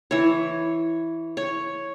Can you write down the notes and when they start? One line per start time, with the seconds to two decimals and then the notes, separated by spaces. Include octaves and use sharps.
0.11 E3 C#5
1.37 C#5